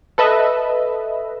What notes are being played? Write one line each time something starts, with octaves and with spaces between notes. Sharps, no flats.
A4 B4 D#5 E5